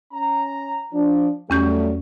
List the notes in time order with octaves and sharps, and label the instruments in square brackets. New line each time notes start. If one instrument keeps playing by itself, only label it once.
[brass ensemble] C#4 A#5
F3 D4
[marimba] E2 C#4 G6 [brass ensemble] F#3 G3 A3